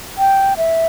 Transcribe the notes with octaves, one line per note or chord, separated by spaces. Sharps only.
G5
E5